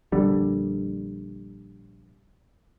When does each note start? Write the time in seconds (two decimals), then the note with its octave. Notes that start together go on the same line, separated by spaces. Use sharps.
0.12 A#1 D3 G3